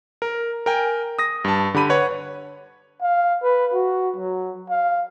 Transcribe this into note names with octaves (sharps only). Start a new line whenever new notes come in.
A#4
A#4 G5 G#5
D#6 A#6
G2 A5
D3 G4 B5 D#7
B4 C#5 F#5
F5
B4
F#4
F#3
F5